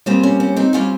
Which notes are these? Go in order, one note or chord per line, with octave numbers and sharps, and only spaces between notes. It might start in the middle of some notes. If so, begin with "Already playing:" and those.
A#2 G3 C4 G#4 C5
C#4
C#4
C4 D#4
G3 C4 C#4 F4